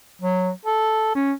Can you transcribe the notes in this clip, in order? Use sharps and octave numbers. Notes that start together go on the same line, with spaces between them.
F#3
A4
C#4